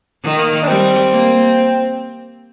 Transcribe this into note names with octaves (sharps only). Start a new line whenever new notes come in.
D#3
A#3
D4
G3 C4
A#3